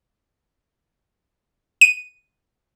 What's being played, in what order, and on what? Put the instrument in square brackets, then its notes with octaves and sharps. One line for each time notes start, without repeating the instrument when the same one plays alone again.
[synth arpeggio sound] D#7